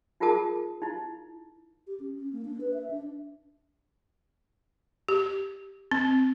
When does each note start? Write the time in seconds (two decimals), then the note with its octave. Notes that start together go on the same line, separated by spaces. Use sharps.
0.20 D#4 F4 G#4 A#4 A5 D#6
0.82 D#4 E4
1.87 G4
2.00 C#4
2.15 C#4
2.33 A#3
2.45 D4
2.60 B4
2.74 E5
2.90 D4
5.08 G4
5.91 C4